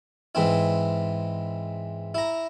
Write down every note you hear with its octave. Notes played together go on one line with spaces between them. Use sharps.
G#2 E3 C4 E4
E4 A#5